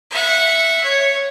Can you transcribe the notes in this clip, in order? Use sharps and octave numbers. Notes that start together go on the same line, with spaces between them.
E5 F#5
C#5